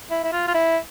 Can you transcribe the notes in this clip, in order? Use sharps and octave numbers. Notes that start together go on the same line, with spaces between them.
E4
E4
F4
F4
E4